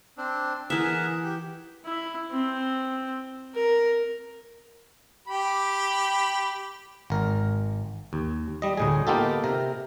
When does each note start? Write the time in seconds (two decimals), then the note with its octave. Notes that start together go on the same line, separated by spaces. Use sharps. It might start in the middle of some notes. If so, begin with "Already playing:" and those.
0.18 C4 D4
0.70 E3 G#4 A#4 E5 F#5
1.24 G4
1.86 E4
2.31 C4
3.55 A#4
5.28 G4 B5
7.10 G#1 A#4
8.13 D#2
8.62 G3 D#5
8.77 D2 A2 G#4
9.07 A#3 B3 D#4 F4 G4 A4
9.44 C3 A#4